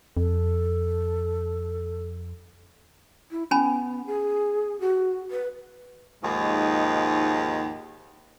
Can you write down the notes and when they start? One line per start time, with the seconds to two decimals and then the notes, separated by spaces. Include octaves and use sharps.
0.17 F2 A4
3.31 E4
3.51 B3 C#4 G#5 B5
4.07 G#4
4.80 F#4
5.31 B4
6.22 D#2 G#2 F3 G#3 D#4